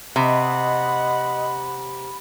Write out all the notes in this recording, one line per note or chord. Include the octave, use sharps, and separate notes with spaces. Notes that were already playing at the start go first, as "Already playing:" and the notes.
C3 D#5 F#5 B5